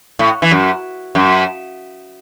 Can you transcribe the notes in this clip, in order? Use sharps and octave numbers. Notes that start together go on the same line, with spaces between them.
A2
E3
F#2
F#2